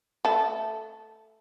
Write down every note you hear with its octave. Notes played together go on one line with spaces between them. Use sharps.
A3 A4